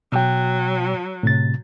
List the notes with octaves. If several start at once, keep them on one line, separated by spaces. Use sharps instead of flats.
B2 F#3 G5
A2 C3 A6